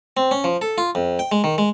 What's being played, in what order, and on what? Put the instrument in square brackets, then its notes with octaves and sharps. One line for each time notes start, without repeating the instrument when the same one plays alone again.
[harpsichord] C4
C#4
F3
A4
F4
F2
G5
G#3
D#3
G#3